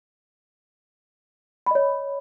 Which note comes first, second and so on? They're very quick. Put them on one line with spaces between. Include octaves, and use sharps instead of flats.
B5 D#5 C#5